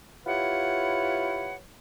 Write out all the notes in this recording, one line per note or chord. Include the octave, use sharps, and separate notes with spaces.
E4 F4 G4 B4 C#5 F#5